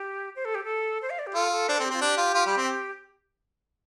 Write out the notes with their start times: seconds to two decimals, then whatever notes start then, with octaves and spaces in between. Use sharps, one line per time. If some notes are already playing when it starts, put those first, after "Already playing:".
Already playing: G4
0.36 C5
0.45 A4
0.55 G4
0.64 A4
1.02 C5
1.10 F5
1.19 D5
1.27 G4
1.35 F4 A4
1.52 A4
1.69 D4 C5
1.77 A4
1.80 C4
1.85 G4
1.90 C4 F4
2.01 D4 G4
2.17 F4
2.34 F4
2.46 G3
2.57 C4